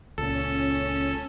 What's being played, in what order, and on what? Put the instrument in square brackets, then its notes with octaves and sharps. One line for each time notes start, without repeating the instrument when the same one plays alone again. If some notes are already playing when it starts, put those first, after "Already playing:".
[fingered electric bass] C#2 A#2 [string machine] C#4 [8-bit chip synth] A4